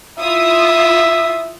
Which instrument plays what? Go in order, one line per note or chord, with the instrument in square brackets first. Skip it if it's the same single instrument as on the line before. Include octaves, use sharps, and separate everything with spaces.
[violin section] E4 F4 D#6 [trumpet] E5